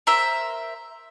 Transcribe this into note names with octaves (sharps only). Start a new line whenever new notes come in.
A#4 C5 E5